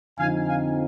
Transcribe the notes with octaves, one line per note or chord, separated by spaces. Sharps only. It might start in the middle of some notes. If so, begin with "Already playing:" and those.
F2 D3 F3 C4 D#4 F5 G#5
F5 G#5